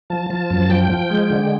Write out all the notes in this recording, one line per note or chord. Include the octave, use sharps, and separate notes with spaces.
F3 A5
F3 A5
F#2 A5
F3 G5
F3
G5
G#3
G5
D3